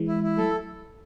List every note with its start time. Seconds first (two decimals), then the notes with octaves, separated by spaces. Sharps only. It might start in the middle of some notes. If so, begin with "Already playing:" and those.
Already playing: E3 G#3
0.08 E4
0.23 E4
0.38 F#3 A3 A4